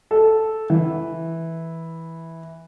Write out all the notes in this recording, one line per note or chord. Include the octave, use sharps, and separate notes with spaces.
A4
E3